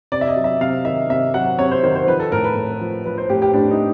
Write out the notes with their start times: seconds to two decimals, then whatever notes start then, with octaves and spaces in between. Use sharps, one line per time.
0.12 C3 D5
0.21 E5
0.28 D#5
0.36 F#3
0.44 E5
0.61 C3 F5
0.85 D#3 E5
1.10 C3 E5
1.34 F#3 F#5
1.58 C3 C#5
1.71 C5
1.83 D#3 C5
1.95 C5
2.08 F3 B4
2.20 A4
2.32 A2 A#4
2.44 B4
2.56 A2
2.81 F3
3.05 F3 B4
3.18 C5
3.30 A2 G4
3.42 G4
3.54 A2 D4
3.71 D#4